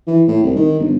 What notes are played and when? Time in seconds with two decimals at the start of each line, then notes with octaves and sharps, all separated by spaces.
0.07 E3
0.28 A2
0.43 C2
0.56 D#3
0.80 G1